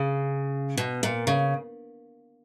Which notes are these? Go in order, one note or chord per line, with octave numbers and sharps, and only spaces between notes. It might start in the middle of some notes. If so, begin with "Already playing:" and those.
Already playing: C#3
B2
A#2
C#3